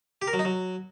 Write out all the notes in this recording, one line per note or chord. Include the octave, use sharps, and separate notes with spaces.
G4
A#4
F#3
D#4
F#3